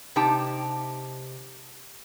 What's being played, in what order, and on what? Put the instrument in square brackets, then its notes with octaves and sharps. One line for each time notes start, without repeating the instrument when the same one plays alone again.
[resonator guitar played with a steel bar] C3 D#4 G4 G5 A5